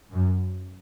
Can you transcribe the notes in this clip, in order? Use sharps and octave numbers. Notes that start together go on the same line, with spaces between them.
F#2